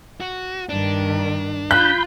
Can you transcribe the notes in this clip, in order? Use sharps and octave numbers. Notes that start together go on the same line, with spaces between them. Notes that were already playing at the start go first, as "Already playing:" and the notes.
F#4
G2 D#3 D4
F4 B5 F#6 G6